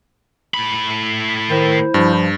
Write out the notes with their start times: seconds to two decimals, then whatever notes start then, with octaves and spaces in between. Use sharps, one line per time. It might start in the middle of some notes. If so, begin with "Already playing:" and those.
0.54 A2 B5
1.50 D#3 E4 C5
1.94 G2 F3